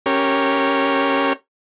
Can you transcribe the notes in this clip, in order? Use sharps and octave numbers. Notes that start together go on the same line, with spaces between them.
C#4 G4 A#4 C#5